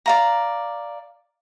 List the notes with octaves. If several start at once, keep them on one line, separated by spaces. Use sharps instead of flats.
D5 F5 A#5